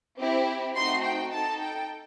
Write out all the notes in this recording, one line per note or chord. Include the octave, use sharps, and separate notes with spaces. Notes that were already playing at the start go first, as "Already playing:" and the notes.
C4 E4 G4
A3 C4 D#4 F#4 C6
G5
D#4 A4 A5
G5